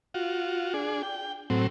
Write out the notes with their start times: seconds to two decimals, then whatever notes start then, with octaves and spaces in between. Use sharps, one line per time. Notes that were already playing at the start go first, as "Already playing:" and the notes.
0.14 F4 F#4
0.74 D4 G#4
1.03 G5
1.50 A2 F#3 C4